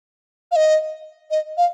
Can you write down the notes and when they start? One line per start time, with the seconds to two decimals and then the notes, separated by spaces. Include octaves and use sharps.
0.52 F5
0.56 D#5
1.31 D#5
1.58 F5